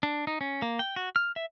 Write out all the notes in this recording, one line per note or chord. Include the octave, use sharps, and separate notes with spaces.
D4
D#4
C#4
A#3
G5
F#4
F6
E5